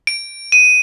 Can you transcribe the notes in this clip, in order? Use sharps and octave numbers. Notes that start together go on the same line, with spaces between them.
D7
D#7